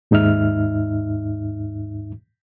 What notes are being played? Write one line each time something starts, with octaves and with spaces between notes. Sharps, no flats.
D#2 G#2 D#4 E5 F6